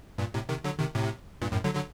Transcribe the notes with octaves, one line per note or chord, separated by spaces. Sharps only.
G2 A#2
A2 C3
C3 D#3
D3 F#3
C3 D#3
A2 C3
G2 A#2
F#2 A2
D3 F#3
D3 F#3